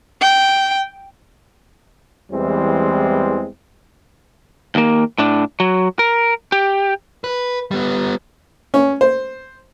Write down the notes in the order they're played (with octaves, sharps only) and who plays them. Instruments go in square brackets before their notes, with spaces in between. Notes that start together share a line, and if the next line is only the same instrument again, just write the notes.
[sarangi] G5
[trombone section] E2 E3 G3 G#3 C4
[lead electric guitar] D#2 A#3
A2 D4
F#3
A#4
G4
B4
G3 B3
[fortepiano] C#4
C5